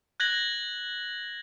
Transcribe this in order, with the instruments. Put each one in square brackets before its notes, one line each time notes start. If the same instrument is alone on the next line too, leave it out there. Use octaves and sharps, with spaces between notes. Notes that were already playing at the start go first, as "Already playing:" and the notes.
[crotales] F#6 G#6 A#6 F#7